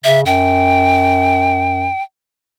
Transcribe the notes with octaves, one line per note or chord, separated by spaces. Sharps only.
C#3 E5
F#2 G5